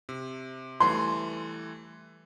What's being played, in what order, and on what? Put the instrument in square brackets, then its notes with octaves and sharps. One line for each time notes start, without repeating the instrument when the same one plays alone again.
[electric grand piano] C3
[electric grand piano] E3 G3 A3 [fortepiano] C6